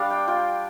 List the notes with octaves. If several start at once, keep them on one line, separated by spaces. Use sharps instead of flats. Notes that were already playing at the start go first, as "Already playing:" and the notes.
Already playing: G3 D4 D5 F5
G5
F4 G5